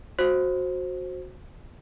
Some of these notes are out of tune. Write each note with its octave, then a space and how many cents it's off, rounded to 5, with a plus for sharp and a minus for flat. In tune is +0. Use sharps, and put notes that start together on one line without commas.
F#4 -10 C5 +10